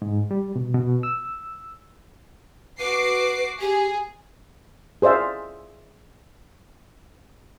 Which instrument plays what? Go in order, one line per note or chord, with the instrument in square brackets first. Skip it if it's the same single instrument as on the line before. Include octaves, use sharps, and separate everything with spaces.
[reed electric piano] G#2
G3
B2
B2
E6
[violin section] F#4 D6 C7 [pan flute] B4
[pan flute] G4 [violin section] G#4
[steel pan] G#4 C5 D5 E5 F5